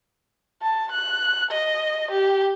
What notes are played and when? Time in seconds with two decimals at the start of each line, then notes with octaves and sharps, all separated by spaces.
0.63 A5
0.92 F#6
1.51 D#5
2.11 G4